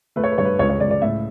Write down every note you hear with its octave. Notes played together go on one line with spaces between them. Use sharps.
A3 B4
C#5
B4
G2 C#5
B4
C#2 C#5
C#5
C#2 D5
D5
A2 E5